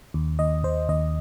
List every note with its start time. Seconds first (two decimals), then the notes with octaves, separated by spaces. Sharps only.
0.14 D#2
0.39 D#2 D#5
0.64 D#2 C5
0.88 D#2 D#5